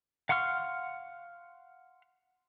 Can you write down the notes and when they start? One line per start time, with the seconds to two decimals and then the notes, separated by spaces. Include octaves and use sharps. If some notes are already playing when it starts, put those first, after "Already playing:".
0.29 F5 F#5 C6 C#6 F6